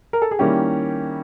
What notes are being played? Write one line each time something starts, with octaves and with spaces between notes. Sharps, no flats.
A#4
A4
G#4
D#3 G3 A#3 C#4 E4 G4